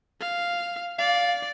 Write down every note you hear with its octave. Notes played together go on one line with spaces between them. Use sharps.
F5
D5 F5